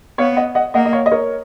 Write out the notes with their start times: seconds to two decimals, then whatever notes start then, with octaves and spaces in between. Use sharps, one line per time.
0.18 B3 C#5 F5
0.37 D#5 F#5
0.55 D#5 F#5
0.74 A#3 D#5 F#5
0.85 D#5
0.93 C#5 F5
1.06 D#5
1.12 A#4 C#5